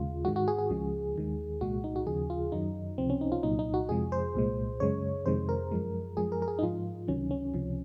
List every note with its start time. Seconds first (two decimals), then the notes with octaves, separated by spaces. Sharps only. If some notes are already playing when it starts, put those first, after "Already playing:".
Already playing: D#2 C#3 G#3 F4
0.25 G#2 D#3 G#3 F#4
0.36 F#4
0.48 G#4
0.59 G#4
0.70 C#2 C#3 F3 G#3
1.16 D#2 D#3 G#3
1.61 C2 A#2 G#3 F#4
1.84 D#4
1.96 F#4
2.07 D#2 C#3 F3 G#4
2.30 F4
2.52 F#2 D#3 F#3 D#4
2.98 C#2 C3 F3 C4
3.10 C#4
3.21 D#4
3.32 F4
3.43 C2 A#2 F#3 D#4
3.59 D#4
3.74 F#4
3.89 F2 C3 F3 G#3 G#4
4.12 C5
4.34 C2 A#2 G#3
4.80 F#2 C#3 G#3 C#5
5.26 F2 C3 D#3 G#3 C5
5.49 A#4
5.72 F#2 F3 G#3
6.17 F#2 F3 G#3 G#4
6.32 A#4
6.42 A#4
6.48 G#4
6.59 D#4
6.63 G#2 F3 G#3 F4
7.08 C#2 C3 D#3 F#3 C#4
7.31 C#4
7.54 C#2 C3 F3